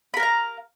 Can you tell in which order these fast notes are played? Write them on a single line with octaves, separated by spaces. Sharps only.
B5 A#4 F5 A#5